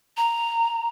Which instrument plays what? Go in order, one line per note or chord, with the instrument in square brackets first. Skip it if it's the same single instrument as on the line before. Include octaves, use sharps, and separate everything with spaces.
[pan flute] A#5